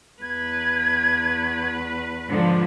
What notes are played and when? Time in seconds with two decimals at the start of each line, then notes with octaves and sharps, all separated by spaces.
0.22 E2 B4 G#6
2.27 G#2 D3 F3